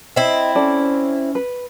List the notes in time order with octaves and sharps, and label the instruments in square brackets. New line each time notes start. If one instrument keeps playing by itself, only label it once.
[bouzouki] C4 E4 [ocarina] D#5
[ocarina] C#4 [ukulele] A4 D5
[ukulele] B4